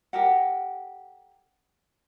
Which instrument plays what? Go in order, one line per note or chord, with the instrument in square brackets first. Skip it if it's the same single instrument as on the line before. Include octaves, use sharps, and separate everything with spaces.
[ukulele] G4 A4 A#4 F#5